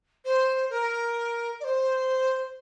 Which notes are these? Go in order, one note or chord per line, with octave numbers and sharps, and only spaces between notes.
C5
A#4
D5
C5